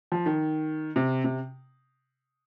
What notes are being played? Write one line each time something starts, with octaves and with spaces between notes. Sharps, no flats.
F3
D#3
C3
C3